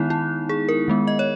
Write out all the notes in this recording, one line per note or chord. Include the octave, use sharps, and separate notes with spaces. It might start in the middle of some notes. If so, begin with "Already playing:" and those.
Already playing: D#3 G#3 B3 D#4 E4
E4
G#4
A#4
D#3 G#3 B3
D#5
C#5